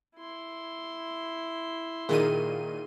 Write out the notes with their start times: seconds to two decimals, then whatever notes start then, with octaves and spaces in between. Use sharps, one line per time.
0.17 E4 C6
2.09 A#2 D#3 G#4 D#7